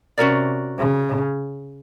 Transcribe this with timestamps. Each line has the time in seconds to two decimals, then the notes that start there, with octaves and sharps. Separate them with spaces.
0.18 C3 C#4 F#4 A#4 D5
0.79 C#3